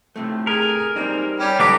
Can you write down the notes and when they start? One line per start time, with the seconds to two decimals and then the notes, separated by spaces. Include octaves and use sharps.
0.16 A2 C3 A3
0.47 G#4 A#4
0.96 G3 A#3 C4 D#4
1.40 G3 C#4
1.60 C#2 G3 B3 D#4 G4 A4 B4 D6